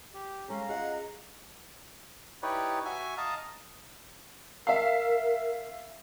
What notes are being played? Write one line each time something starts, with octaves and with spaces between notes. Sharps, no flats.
G4
G#3 C#4 A4 F5 A#5
C#4 F4 G#4 D#5 F#5
D#4 E4 G4 B4 C#5 D5
F#4 E5 G#5
D#5 F5 A5 A#5
A#4 E5 F5